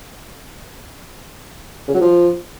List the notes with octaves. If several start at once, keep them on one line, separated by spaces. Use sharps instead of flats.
C#3
F#3
F3